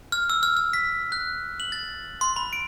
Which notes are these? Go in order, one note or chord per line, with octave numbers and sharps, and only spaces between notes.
F6
E6
F6
F6
B6
F#6
F#7
A6
C6
B5
D7